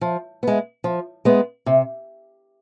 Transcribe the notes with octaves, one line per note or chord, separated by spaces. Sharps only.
F3
G#3 B3
F3
G#3 B3
C3